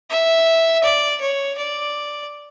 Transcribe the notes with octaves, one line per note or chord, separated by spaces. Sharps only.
E5
D5
C#5
D5